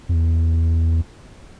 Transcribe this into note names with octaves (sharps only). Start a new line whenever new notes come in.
F2
E2